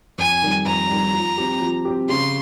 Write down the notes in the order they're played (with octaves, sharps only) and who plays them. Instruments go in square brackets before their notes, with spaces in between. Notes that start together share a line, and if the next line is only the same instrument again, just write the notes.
[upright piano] F2 [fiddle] G#5
[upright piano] D#3 G3
[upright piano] F2 [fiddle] A#5
[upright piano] D#3 G3
F3
C4 G4
F3
C4 G4
[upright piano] C#3 [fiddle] C6